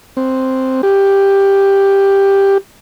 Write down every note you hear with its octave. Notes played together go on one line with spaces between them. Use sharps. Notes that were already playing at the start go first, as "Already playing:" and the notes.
C4
G4